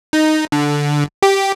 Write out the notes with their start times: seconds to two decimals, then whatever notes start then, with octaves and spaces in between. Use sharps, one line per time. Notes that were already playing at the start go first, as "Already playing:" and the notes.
0.13 D#4
0.52 D3
1.22 G4